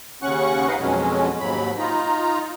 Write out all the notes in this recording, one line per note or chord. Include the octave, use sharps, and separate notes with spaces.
D#2 C#3 C#4 F#5 C#6 F#6
D#4 B4 D#5 F5 F#5
F2 B2 F#3 G#3 C#4
D#2 G#2 F#3 B5
D#4 F4 A#5